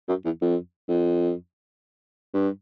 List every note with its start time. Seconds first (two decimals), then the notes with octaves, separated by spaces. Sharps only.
0.09 F#2
0.25 E2
0.41 F2
0.89 F2
2.34 G2